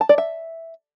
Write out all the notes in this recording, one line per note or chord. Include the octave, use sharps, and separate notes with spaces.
A5
D5
E5